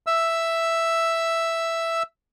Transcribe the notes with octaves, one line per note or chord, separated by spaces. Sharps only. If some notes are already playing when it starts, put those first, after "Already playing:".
E5 E6